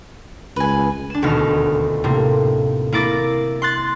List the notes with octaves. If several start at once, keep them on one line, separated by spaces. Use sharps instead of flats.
C#2 B4 G#5
D4 E7
D#1 D2 B2 D#4 F6
A2 C3 A#3
A#3 E4 D6 A6 A#6
C6 F#6 A6